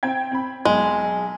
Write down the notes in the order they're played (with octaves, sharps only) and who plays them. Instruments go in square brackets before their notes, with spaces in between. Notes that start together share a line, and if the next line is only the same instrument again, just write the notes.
[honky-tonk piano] C4 G5 G#6
C4 B5
[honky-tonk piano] B1 [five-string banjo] G#3